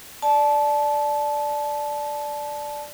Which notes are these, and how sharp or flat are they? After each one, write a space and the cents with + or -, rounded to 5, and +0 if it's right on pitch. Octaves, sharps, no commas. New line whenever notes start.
D5 +0 A5 -20